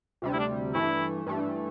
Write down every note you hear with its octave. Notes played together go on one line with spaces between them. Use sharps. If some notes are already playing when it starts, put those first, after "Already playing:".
D2 C3 G3
E4
D4
G2 E3 A3 E4
G2 E3 A3